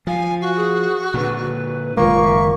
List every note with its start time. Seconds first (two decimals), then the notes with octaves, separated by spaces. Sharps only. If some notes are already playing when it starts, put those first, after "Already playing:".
0.07 F3 F5 G#5
0.41 F#4
0.56 G#4
1.14 A#2 D3 B4
1.97 F#1 D#3 G#3 A#3 F4 C#6
2.22 E5